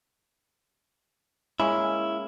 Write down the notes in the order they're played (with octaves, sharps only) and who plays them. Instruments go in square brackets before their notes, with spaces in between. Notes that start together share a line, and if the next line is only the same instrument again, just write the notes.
[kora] G#3 A#3 C#4 [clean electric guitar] E4